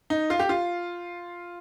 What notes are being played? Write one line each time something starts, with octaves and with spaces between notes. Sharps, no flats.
D#4
F4
G4
F4